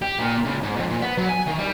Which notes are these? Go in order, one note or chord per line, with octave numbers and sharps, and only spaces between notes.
G4
A#2
C#2
G#2
F2
A#2
B3
F#3
G#5
D#3
G3